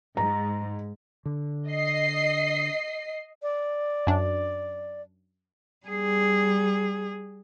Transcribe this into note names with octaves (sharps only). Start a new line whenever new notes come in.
G#2 A#5
D3
D#5 C7
D5
F#2 D4
G3 G#4